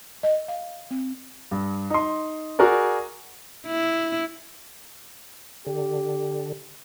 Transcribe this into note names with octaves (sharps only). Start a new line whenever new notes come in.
D#5
F5
C4
G2
D#4 C6
F#4 G#4 A#4 D5
E4
D3 G4